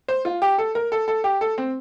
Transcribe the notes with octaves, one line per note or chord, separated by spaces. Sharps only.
C5
F4
G4
A4
A#4
A4
A4
G4
A4
C4